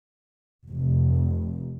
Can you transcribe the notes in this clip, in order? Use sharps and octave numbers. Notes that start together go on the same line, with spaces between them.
F1